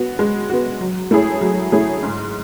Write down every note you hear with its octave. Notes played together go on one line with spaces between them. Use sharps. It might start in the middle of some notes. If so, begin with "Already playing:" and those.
Already playing: B3 F#4
G#3
B3 F#4
F#3
A3 E4 G#4 C#5
F#3
A3 E4 G#4 C#5
G#2